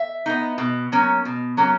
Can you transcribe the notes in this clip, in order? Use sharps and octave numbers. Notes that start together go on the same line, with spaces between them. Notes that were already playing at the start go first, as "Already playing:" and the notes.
Already playing: E5
B3 D#4
B2
F#3 A#3 C#4
B2
F#3 A#3 C#4